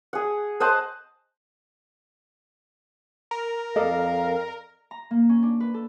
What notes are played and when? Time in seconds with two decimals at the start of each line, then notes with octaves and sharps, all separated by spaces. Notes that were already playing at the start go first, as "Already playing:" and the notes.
0.13 G#4 F#5
0.60 C5 D#5 F#5 A5
3.31 A#4
3.76 F2 A4 D5 D#5 F5
4.91 A#5
5.11 A#3
5.29 C#4
5.43 D4
5.60 B4
5.74 A4